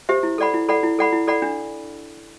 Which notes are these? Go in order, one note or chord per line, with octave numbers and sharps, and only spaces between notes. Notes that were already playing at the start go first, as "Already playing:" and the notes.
G4 C5 E5
E4
A4 D5 F#5 B5
E4
A4 D5 F#5 B5
E4
A4 D5 F#5 B5
E4
A4 D5 F#5 B5
D4